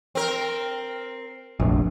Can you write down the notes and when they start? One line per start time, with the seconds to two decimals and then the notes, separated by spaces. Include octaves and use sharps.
0.15 C4 A#4
1.60 F1 A#1